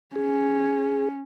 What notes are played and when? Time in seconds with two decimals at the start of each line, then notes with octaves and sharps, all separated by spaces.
0.16 C#4 G#4